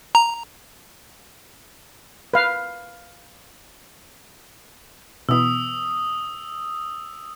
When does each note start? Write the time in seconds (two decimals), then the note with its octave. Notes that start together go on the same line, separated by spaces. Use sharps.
0.15 A#5
2.34 B4 F5
5.29 B2 E3 B3 D#6 E6